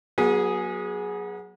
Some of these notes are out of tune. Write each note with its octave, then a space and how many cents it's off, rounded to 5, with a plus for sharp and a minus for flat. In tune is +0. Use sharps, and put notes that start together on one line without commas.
F#3 +0 B3 -40 G#4 +0